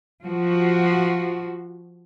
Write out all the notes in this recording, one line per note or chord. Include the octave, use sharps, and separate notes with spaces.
F3 F#4